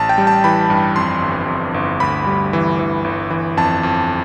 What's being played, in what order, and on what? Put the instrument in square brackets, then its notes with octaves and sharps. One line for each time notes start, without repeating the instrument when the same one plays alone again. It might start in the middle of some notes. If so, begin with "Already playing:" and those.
Already playing: [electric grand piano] A1 A5
G5
G3
A5
E3 B5
G2
F2 C6
G1
F2
G1
D2 B5
G3
E3
E3
G1
E3
F2 A5
F2